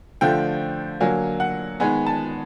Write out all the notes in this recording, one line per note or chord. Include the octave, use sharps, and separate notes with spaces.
D3 F3 A3 G5
D3 F#3 A#3 G#5
F#5
D#3 G#3 B3 G#5
A5